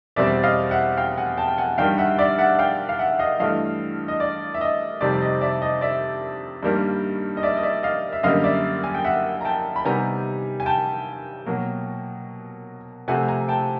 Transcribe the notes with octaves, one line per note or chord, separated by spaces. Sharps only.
E2 B2 G3 C4 D5 E5
D#5 F5
E5 F#5
F5 G5
F#5 G#5
G5 A5
G5
F#5 G#5
G2 D#3 G3 F5 G5
E5 F#5
D5 E5
E5 F#5
F5 G5
F5
E5 F#5
D#5 F5
G2 E3 A3 D#5 F5
D#5
D5
E5
D#5
F2 C3 D#3 G3 C4 D5
D#5
D5 E5
D#5
D5 E5
G2 D#3 G3 A#3
D#5
D5 E5
D#5
D5 E5
D#5 F5
E5
F#2 D3 G3 A#3 D#5 F5
D5 E5
G#5
G5
E5 F#5
A#5
G5 A5
B5
C3 D#3 G3 B3 G#5 A#5
G#5
G5 A5
B2 F#3 A#3
C3 F3 A3 C4 F#5 G#5
G#5 A#5
G5 A5